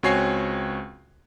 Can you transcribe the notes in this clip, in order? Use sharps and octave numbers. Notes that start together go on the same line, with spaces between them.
C#2 C4 F#4 C#5 G#5 C7